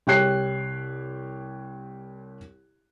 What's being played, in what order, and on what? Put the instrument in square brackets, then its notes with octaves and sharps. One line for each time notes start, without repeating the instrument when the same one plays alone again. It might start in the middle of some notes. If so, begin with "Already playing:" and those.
[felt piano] C2 G4 C#5 G5 F#6 C7